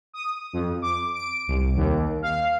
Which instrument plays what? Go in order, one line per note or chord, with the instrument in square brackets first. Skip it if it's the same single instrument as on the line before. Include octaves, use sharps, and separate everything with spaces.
[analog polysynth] D#6
F2
D6
D7
C2
D#2
F5